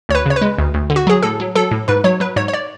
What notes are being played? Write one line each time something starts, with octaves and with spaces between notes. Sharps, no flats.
D2 C#5
B4
C#3 C#5
B4
G#3
D2
D2
D3
F#4
F#3 G#4
A2 A4
F#3
F#3 A4
A2
G#2 B4
F#3 C#5
F#3 B4
G#2 C#5
C#5
D5